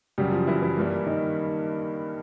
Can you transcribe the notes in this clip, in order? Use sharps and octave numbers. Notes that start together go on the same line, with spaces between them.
F#2 C#3 F#3 G3 G4
F3 F4
E3 E4
E3 E4
G2 E3 G3 A#3
D#3 D#4